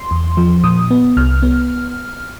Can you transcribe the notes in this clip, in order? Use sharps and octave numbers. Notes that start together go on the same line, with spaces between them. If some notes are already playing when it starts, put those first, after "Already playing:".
Already playing: C6
E2
F3
A#2 D#6
B3
C2 F6
B3